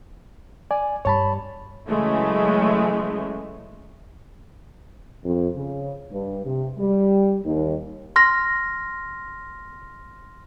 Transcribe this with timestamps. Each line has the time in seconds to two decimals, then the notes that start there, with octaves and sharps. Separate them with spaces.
0.71 D5 G#5
1.05 G2 G3 C#5 A5 B5
1.89 C#3 E3 F#3 G#3 A3
5.25 F2
5.55 C#3
6.11 G2
6.45 C3
6.78 G3
7.45 D#2
8.16 C6 F6 A#6